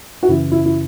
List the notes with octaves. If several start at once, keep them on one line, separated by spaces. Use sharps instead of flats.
F#4
F#2 C#3 E3 E4
E4
E4